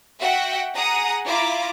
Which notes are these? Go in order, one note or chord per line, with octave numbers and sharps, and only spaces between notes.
F#4 E5 F#5 G5
G#4 F#5 A#5 D#6
E4 F4 A#5 D6